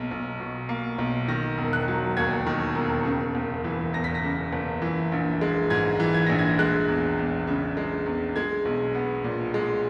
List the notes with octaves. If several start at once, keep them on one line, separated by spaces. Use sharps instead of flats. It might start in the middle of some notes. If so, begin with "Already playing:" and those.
Already playing: B1 A#3
B1
B2
A#3
B1
D#3 A#6
E1
F#6
F#3
D#2 G#6
D#3
E1
C#3
F#1
E3
E2 A#6
B6
A#6
C#3
F#1
E3
A#1
G#3
G#2 G#6
E3
G#6
A#1 A#6
G#6
G#3 F#6
E2
E2
C#3
G#3
E2
G#3 G#6
B1
B3
A#2
G#3